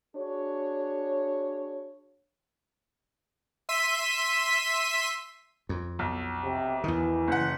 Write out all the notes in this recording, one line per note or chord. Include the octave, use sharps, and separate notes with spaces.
D4 F#4 G#4 C#5
E5 C6 B6 D#7
F2
B1
C3
E2 D#3 E3
F#1 F#5